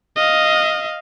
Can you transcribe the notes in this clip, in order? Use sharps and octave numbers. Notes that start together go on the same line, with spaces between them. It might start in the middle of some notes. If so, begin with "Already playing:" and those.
D#5 F5